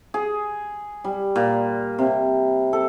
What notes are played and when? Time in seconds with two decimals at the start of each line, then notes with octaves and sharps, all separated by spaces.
0.14 G#4
1.04 G3
1.36 A#2
1.99 C3
2.73 A4